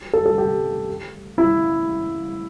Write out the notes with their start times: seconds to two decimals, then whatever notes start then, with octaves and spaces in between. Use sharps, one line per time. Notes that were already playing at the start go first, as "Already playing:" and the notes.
0.13 A4
0.26 A4
0.38 G4
1.38 E4